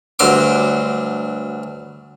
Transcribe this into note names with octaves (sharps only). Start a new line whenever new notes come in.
D2 G2 F#3 C6 D6